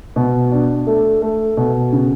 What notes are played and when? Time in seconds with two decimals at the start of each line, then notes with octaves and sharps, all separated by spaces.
0.16 B2
0.51 D4
0.87 A3
1.22 A3
1.57 B2
1.92 C#3